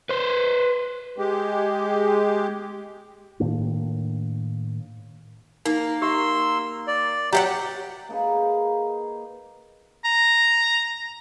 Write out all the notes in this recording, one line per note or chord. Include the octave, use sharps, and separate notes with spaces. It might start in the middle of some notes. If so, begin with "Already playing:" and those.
B4 C5
G#3 G4
A2 D#3 A#3 D4
A#3 D#4
G4 C6 E6
D5
F#3 G4 F5 F#5 A#5
A#3 D#4 G#4 B4
A#5